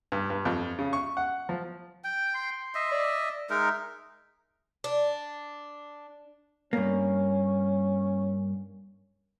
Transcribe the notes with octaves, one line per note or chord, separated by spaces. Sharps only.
G2
G2
F2
C#3
C#6
F#5
F3
G5
C6
D#5 E5
D5
G#3 D#4 A#4 E5
D4
G2 A#3 C#4